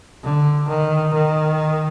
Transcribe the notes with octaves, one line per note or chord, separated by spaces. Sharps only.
D3
D#3
D#3